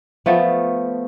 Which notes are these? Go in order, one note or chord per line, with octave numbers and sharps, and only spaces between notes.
F3 A3 B3